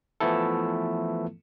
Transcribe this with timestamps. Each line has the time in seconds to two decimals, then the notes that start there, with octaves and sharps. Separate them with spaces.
0.20 E3 F3 A3 B3 E4 A4